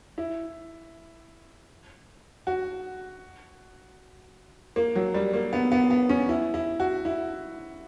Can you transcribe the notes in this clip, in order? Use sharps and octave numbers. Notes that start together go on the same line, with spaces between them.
E4
F#4
A#3
F#3
G3
A#3
B3
B3
B3
C#4
E4
E4
F#4
E4